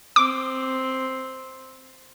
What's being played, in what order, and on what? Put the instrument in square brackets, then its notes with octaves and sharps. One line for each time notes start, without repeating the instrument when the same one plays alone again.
[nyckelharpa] C4 [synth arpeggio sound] D6